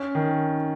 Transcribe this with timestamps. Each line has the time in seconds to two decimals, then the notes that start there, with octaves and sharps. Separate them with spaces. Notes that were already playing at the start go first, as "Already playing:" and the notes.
Already playing: C#4
0.15 D#3